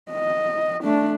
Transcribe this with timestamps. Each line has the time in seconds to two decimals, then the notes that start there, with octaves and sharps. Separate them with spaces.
0.11 D#5
0.84 A3 D4